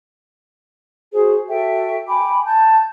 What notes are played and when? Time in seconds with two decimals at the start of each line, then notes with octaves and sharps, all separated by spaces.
1.13 F#4 G#4 C5
1.49 F#4 A4 E5 G5
2.09 G5 G#5 B5 D6
2.47 A5 G6